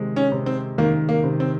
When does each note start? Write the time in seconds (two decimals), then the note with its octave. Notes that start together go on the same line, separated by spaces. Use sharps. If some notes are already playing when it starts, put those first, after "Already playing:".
Already playing: C3 D#3 G#3
0.16 C#4
0.32 C3
0.46 C4
0.78 D#3 A#3
1.09 A#3
1.24 C3
1.40 C4